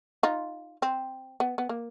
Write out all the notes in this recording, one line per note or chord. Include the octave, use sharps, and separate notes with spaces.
D#4 F4
C4
B3
B3
A#3